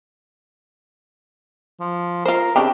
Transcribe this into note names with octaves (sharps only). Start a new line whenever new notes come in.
F3
F4 A#4 C5
C#3 C4 D4 G4